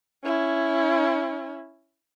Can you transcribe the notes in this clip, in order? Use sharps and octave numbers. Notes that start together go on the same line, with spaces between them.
C#4 E4